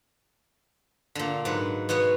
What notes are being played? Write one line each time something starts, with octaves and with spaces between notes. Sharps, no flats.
A#2 D3
G#2 F#3 B4
B2 B3 F#4 C#5